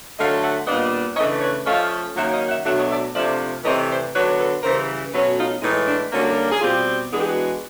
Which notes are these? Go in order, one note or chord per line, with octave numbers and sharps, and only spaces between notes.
D3 F#3 A3 D#5 F5
E5 F#5
A#2 G3 B3 D4 D#5 F5
C#3 E3 A3 D4 C#5 D#5
B4 C#5
F3 A3 C#4 D#5 F5
D#3 F#3 A#3 C#4 E5 F#5
D#5 F5
E5 F#5
B2 F#3 A3 D4 E5 F#5
C#5 D#5
D5 E5
C3 F3 A3 D4 D5 E5
C3 E3 A3 C4 C#5 D#5
C5 D5
D3 F#3 B3 D4 B4 C#5
A4 B4
C#3 E3 G3 A#4 C5
B2 F#3 A3 C#4 A4 B4
D#4 F4
A2 E3 G#3 D#4
D4
D3 G3 A#3 C#4 E4 F#4
G#4
B2 G3 C4 F4 G4
E3 G#3 B3 D4 G#4
G4
F#4 G#4